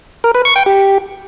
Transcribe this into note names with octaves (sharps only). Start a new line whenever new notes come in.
A#4
B4
C#6
G5
G4